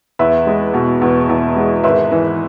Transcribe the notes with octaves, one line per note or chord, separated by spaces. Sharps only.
E2 B4 E5
G#3
B2
E2
E2
G#3
G#1 B4 E5
E3